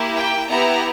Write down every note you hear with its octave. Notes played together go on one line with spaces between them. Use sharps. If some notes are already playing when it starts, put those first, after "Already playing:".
Already playing: A#3 E4 G4
G5
B3 E4 G4 A#5